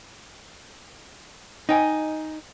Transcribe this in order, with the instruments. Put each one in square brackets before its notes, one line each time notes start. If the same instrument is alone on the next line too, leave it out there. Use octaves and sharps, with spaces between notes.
[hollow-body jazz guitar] D#4 [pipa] D#5 G5 G#5